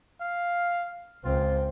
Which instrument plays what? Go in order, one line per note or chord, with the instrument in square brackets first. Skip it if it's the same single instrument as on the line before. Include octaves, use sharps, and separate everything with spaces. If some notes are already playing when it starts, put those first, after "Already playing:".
[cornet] F5
[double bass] C#2 C4 [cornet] F4